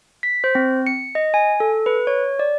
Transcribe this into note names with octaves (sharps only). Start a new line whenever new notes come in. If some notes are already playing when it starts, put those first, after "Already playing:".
B6
C5
C4
C#7
D#5
G#5
A4
B4
C#5
D5